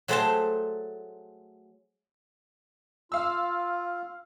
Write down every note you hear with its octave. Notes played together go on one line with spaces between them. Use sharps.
F#3 A3 G#4 C5 G5 A5
F4 F5 E6